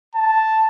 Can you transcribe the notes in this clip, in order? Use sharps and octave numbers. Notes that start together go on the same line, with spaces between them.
A5